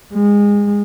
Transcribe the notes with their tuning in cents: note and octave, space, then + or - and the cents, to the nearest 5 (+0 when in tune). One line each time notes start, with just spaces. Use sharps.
G#3 -25